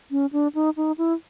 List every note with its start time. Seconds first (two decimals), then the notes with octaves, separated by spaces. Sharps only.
0.11 C#4
0.33 D4
0.55 D#4
0.77 D#4
0.98 E4